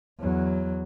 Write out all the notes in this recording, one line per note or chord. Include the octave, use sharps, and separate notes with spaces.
E2 F#3